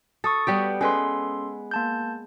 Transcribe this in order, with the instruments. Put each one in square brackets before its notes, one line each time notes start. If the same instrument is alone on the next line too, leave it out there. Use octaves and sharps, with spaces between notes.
[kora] A4 [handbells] C#6 D#6 A6
[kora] G3 B3 G4 [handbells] D7
[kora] G#3 B4 [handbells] C#4 A4 C6
[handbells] A#3 A5 G6